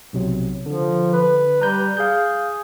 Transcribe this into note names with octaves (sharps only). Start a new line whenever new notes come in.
B1 C3 F#3
D3 F3
B4
G3 A#5 F#6 G6
G#4 F5 G6